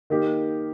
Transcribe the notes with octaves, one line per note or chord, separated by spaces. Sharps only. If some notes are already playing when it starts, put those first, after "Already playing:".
D#3 A#3 D#4 G4